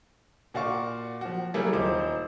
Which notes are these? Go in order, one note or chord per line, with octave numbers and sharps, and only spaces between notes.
A#2 F#4 D5 F5 C#6
F3 F#4
F#3 G3 A3 A#3 E4 G#4
D#1 D#4 C5 D6